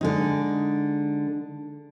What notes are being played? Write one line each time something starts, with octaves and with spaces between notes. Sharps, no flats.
D3 G#3 D#4